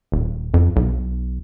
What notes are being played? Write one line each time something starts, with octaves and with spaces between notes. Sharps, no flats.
D#1
F2
B1